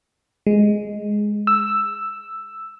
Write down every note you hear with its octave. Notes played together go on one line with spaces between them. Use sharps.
G#3
E6